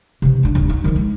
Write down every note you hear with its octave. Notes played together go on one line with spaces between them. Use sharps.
C3 E3
D4 E4
D#1 A1
D#4
D#3 F3
G#3